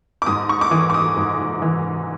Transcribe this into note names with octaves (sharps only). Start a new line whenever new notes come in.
D6
G#2 D#6
C#6
D6
E3 D#6
D6
D#6
G#2
E3